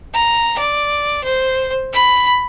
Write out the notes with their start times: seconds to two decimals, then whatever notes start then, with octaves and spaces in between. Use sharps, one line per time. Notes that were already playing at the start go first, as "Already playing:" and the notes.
0.14 A#5
0.58 D5
1.24 C5
1.93 B5